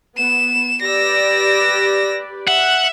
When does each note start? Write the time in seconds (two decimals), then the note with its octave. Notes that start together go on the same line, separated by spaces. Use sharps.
0.18 B3 E7
0.82 G4 B4 D5 E6 A#6
2.48 E5 F#5